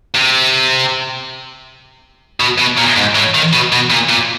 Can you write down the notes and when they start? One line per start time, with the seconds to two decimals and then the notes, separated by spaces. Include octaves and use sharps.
0.15 C3
2.40 B2
2.59 B2
2.78 A#2
2.97 G#2
3.16 A2
3.35 D#3
3.53 B2
3.72 B2
3.90 A#2
4.09 A#2